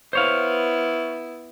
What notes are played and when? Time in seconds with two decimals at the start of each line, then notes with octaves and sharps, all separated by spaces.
0.13 B3 E4 C5 C#5 F5